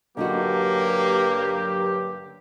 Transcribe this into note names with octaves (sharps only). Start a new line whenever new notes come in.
G2 D3 F#3 A#3 D#4 F#4 G4